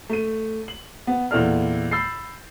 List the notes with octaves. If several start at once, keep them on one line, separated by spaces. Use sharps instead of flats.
A3 D#7
F#7
B3
E2 A#2 E4 A4 D5 F6
B5 E6 G6 A6 C7